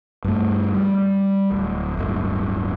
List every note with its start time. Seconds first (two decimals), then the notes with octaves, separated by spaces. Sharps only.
0.24 G2 A3
0.74 G3
1.51 D1
1.97 D1 G1